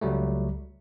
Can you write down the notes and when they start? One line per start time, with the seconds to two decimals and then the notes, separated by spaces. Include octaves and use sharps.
0.01 C#2 F#3 G3 A3